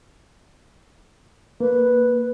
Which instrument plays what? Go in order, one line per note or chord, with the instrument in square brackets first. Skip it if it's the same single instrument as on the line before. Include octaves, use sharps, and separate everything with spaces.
[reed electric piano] A#3 [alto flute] B4